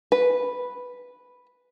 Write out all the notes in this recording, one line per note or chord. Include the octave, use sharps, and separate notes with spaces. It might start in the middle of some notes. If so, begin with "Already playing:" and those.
B4